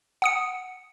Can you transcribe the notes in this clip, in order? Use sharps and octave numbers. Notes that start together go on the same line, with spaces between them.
F#5 D#6 C#7